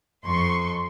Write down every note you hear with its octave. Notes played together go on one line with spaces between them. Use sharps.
F2 C6 C#6